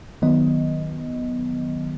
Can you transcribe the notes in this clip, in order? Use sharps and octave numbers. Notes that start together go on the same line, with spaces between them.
D#3 F#3 B3 D#5